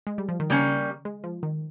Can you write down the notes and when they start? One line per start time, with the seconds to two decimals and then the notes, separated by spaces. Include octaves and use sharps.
0.07 G#3
0.18 G3
0.29 F3
0.40 D#3
0.50 C#3 G3 A#3 C#4
1.05 G#3
1.24 F3
1.43 D#3